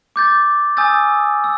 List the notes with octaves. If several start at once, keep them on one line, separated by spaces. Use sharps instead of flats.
D6 G6 A6
G#5 D#6 E6 G6 A6
E6